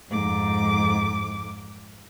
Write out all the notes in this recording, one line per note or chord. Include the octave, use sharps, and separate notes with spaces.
F2 G#2 D6